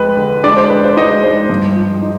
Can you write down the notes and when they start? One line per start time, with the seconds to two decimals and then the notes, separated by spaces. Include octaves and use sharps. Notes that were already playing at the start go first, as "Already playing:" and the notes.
Already playing: F2 G#3 B4
0.17 D3
0.43 G#3 D4 D5
0.57 C5
0.70 G#3 B4
0.84 C5
0.97 G#3 D#4 D#5
1.23 G#3 C5
1.49 G2
1.75 F3
2.02 D#4